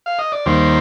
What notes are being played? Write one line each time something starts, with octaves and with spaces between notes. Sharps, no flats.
F5
D#5
D5
D#2 D#3 G3 A#3 C5